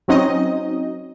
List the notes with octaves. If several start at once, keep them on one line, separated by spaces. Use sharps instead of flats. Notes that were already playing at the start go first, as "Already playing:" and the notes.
F#3 C4 C#4 D#4 D#5